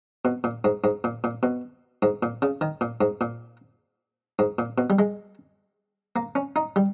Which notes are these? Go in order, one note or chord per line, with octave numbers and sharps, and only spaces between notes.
B2
A#2
G#2
G#2
A#2
A#2
B2
G#2
A#2
C#3
D#3
A#2
G#2
A#2
G#2
A#2
B2
G3
G#3
A#3
C#4
D#4
G3